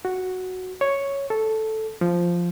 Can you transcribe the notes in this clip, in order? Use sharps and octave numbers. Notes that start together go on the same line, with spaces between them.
F#4
C#5
A4
F3